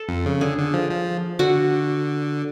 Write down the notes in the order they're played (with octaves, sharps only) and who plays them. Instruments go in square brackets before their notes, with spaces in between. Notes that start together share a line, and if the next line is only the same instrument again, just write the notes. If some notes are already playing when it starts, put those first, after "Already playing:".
Already playing: [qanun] A4
[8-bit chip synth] F2
C#3
[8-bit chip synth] D3 [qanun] G#4
[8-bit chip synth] D3
F3
F3
[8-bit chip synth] D3 [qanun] F#4